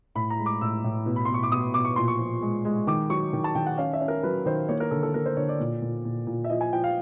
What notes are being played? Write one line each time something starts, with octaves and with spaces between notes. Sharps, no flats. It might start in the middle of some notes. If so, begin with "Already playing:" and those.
A2 B5
A#5
G#3
D6
A2 E6
A2
B2
B5
B2 C6
C#6
D6
B2 D#6
B2 D6
C#6
A#2 C6
C#6
F3
G#3
G#3
D#3 D6
F#3 C#6
D#3
A5
D#3 G5
F#5
C#4 F5
E5
C#4
A#4
F#3 B4
D#3 C5
A#3 C#5
A#4
D3 A4
A4
A#3 A#4
C5
D3 C#5
D5
A#2
A#2
A#2
A#2
E5
F3 D#5
G#5
F3 G5
F5